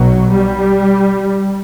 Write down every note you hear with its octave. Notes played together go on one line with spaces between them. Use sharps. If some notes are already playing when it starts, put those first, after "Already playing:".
Already playing: B1 B2 F#3
G3